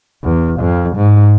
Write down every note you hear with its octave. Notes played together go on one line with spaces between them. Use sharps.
E2
F2
G#2